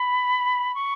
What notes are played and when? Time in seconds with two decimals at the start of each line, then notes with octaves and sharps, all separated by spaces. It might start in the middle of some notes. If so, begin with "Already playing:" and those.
Already playing: B5
0.75 C#6